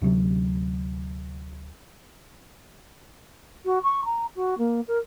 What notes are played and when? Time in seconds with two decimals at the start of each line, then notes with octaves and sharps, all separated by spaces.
0.02 D2 C3 F#3
3.65 F#4
3.83 C#6
4.05 A#5
4.35 F#4
4.58 A#3
4.87 A#4